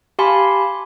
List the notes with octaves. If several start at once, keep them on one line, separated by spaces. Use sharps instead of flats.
G4 F5 G#5 A5 B5 C6